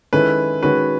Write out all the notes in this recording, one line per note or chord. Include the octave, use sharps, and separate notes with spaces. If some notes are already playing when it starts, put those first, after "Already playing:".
D#3 G#3 C#4 E4 A4 B4
D#3 G#3 C#4 F#4 B4